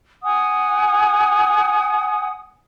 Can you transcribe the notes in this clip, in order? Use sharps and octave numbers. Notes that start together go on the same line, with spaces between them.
F#5 G#5 D#6